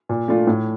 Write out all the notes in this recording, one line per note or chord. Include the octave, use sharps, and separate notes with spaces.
A#2
A3 D4 F4
A2